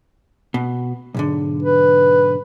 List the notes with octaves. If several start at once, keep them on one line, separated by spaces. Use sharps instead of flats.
B2
B1 G#2 D3
B4